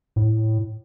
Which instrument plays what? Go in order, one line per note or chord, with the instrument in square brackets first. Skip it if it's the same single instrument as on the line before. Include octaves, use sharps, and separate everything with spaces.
[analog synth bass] A2